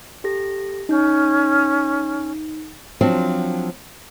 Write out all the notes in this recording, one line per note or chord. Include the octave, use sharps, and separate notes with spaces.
G4 A4 A#6
C#4 D#4 G6
F3 F#3 C4 D4